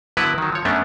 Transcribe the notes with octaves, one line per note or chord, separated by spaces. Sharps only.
D3 F#3 B3 E4 A#4 B4
D#3 F#3
F3 C#5
F#2 A3 B3 C#4 D4